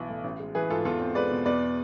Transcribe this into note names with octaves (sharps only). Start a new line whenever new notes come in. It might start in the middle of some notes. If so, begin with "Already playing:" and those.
Already playing: B1 E3 B3
A2
A1
G#3
E3 G#4 B4
G#2 F4 A4
E2 F4 A4
C4
G#3 B4 D5
B2
E2 B4 D5